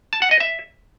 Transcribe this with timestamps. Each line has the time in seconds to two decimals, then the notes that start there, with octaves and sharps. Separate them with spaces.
0.13 A5
0.22 F#5
0.31 D#5
0.40 E5